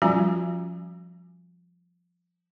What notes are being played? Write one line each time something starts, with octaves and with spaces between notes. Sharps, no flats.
F3 G3 C#4 F4 F#4 G#5